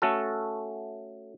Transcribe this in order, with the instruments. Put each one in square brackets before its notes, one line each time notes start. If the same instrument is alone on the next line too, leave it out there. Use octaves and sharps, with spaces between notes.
[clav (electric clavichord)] A3 C#4 F#4 A4